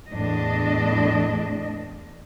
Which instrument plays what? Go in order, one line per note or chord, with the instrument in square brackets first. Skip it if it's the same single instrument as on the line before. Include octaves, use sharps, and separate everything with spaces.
[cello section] E2 A2 D4 D#5